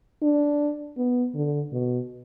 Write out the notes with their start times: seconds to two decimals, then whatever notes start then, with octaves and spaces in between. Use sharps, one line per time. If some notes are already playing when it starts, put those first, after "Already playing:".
0.22 D4
0.97 B3
1.35 D3
1.72 B2